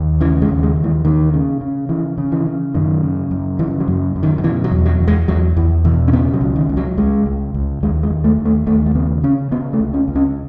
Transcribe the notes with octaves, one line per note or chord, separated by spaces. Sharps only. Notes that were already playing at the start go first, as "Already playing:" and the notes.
Already playing: D#2
C#3 E3
G#3
D#2
G#3
D#2
E3
D#2 D#3
C#3
C#3
C#3 E3
C#3
E3
C#3
F#2 D#3
C#3
F#2
C#3 E3
F#3
F#2
F#2
D#3
D#3
B2 E3
F#3
E2
F#3
E2
G#3
E2 F#3
E2 E3
B2 E3
C#4
C#3 B3
F#3
C#2
D#3
C#2
F#3
C#2 G#3
C#2
C#2
D#2 G#3
G#3
D#2
A3
D#2
A3
D#2 A3
A3
C#3 B3
C#3 C#4
C#3 B3
A3
C#2
C#4
C#2
C#4